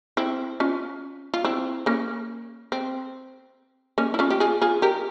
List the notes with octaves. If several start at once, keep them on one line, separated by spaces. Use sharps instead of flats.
C4 E4
C#4 F4
F4
C4 E4
A#3 C#4
C4
A#3 C#4
E4
C#4 F4
G4
F4 G#4
F4 G#4
G4 A#4